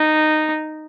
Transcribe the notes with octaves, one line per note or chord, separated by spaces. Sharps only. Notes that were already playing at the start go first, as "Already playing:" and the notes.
Already playing: D#4